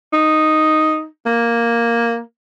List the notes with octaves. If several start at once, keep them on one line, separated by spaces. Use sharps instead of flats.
D#4
A#3